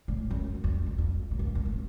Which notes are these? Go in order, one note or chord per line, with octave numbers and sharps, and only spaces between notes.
A2
F#2
F2
F#2
F2
A2
F#2
F2
F#2
A2